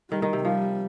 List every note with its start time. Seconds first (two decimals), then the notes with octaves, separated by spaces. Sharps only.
0.11 D#3 G3
0.22 D#3
0.33 C3
0.44 F3 G3